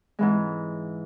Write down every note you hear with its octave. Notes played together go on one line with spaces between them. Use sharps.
G#2 E3 G#3